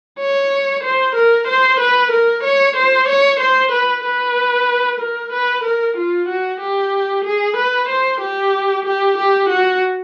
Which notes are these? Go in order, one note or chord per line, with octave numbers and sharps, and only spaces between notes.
C#5
C5
A#4
C5
B4
A#4
C#5
C5
C#5
C5
B4
B4
A#4
B4
A#4
F4
F#4
G4
G#4
B4
C5
G4
G4
G4
F#4